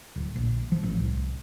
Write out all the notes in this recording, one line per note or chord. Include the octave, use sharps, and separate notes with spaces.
D1
A#1
F3
A1
C2